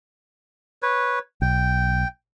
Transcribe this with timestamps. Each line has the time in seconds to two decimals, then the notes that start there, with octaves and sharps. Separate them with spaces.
0.83 B4 C#5
1.42 B1 G5